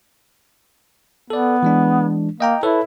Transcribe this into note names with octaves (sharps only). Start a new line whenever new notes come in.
B3 A4 D5
E3 G#3 D4
A#3 D#5 G5 A#5
E4 A4 B4 C#5